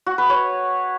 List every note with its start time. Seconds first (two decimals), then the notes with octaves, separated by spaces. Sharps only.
0.06 F#4
0.18 B4
0.30 C#5